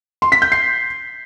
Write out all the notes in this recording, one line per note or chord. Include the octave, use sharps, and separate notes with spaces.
C6
B6
G6
C7